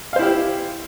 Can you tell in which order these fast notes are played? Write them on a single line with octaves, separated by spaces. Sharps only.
F5 C5 E4 G4